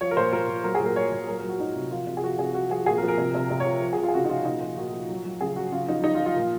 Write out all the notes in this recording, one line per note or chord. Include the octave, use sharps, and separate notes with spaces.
F3 C#5
A#4
A#2 C5
A#2 A#4
A#2
F#3 A#4
G#4
A#2
A#4
F#3 C#5
A#2 C#5
F#3 A#4
A#4
F#3
F#4
F#3 D#4
C3
F3 F4
C3
G#4
F3 F#4
C3 G#4
F3 F#4
F3 G#4
A#2 G#4
A#4
F3
A#4
C3
C3
C3
C#5
F3
F3
G#4
F3
F4
G#4
C#3 F#4
D#4
F3 F4
A#2 D#4
F3 F4
A#2 F#4
F3
F#3
F#3
C#3 G#4
F#3 F#4
C#3 F4
F3 D#4
F3 D#4
F4
F3
F4
A#2